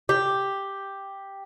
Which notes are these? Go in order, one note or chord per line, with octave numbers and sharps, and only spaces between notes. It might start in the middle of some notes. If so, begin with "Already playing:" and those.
G4